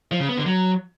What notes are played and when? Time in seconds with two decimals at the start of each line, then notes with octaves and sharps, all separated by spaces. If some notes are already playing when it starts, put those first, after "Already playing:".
0.12 F3
0.20 C#3
0.29 B3
0.38 D3
0.46 F#3